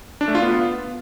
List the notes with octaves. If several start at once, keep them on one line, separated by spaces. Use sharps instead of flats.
D4
A3
F4
B3